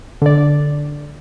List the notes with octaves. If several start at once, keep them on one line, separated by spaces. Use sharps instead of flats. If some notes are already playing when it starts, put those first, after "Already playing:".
D3 D5